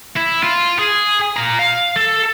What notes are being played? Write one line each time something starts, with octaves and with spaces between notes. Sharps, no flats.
E4
F4
G#4
F4 A#5
F5
A4